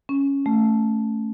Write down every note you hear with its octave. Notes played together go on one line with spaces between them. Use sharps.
C#4
A3